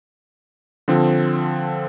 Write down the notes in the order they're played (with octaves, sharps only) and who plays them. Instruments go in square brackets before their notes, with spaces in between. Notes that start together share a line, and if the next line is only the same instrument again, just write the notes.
[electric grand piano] D3 F3 C4